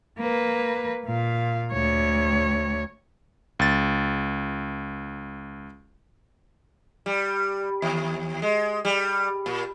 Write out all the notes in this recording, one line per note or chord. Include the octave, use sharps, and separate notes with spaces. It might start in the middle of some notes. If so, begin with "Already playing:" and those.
A#3 B4
A#2 F5
D2 C#5
C#2 A6
G3
D#2
G#3
G3
A#2